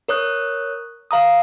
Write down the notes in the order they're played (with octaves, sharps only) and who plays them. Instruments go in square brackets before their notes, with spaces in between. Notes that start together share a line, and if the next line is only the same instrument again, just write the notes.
[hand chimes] A#4 C#5 D#6 F#6
F5 A#5 D#6